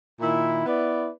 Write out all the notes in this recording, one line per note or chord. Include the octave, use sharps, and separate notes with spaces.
A#2 D#3 E4
B3 E4 B4 D5